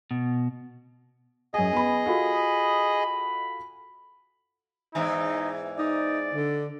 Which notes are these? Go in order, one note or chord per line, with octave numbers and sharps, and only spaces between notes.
B2
F#2 G#4 D#5 G#5
B3 B5
F4 F#4 A4 B5
E2 G#2 E3 D#4
D#4 D5
D3